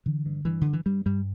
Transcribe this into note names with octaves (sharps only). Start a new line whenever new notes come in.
D3 E3
G2
G2 E3
G2 D3
E3
G2 G3
G2 G3